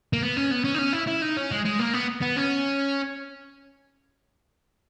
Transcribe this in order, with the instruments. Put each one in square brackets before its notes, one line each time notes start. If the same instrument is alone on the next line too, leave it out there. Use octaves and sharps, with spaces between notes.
[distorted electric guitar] A#3
B3
C#4
B3
C#4
D#4
C#4
E4
E4
D#4
C#4
G#3
G#3
A#3
B3
B3
C#4